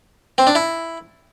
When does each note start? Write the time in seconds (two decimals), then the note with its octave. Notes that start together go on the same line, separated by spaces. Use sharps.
0.38 C4
0.47 D4
0.55 E4